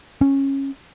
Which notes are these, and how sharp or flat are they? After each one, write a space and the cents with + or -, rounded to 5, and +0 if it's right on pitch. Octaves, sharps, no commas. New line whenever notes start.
C#4 -15